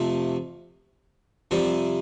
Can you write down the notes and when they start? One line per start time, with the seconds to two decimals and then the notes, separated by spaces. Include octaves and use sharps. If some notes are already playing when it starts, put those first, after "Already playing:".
Already playing: F2 C3 F3 A3
1.51 F2 C3 G3